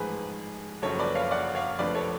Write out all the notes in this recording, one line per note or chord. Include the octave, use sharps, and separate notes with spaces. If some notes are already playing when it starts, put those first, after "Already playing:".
Already playing: A1 G#2 F3 G#4 B4
F#1 F#2 F3 A4 C#5
B4 D5
C#5 F5
D5 F#5
C#5 F5
F1 F2 D3 F3 B4 D5
A4 C#5